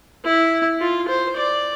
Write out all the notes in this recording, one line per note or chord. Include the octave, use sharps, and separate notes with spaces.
E4
F4
C5
D5